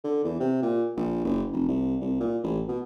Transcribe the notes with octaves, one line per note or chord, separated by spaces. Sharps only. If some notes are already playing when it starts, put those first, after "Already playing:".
D3
E2
C3
A#2
A#1
F#1
F1
C2
C2
A#2
A1
B2